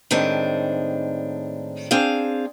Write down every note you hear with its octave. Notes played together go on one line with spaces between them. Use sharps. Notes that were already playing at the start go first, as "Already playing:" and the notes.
A2 D#3 G#3 C4 D4
C4 D4 G#4 F5